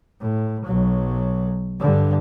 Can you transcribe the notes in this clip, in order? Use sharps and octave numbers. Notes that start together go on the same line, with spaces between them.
A2
B1 F#3
G2 D3